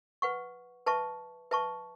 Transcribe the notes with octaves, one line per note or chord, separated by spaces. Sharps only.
B4 F#5 C#6
B4 E5 A5 C#6
B4 E5 A5 C#6